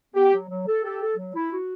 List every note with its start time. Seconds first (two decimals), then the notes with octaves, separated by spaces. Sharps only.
0.15 B3 G4
0.33 F#3
0.49 F#3
0.67 A4
0.83 G4 A4
1.01 A4
1.17 F#3
1.35 E4
1.52 F#4